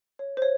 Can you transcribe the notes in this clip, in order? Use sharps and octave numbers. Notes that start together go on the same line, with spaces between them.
C#5
C5
C#5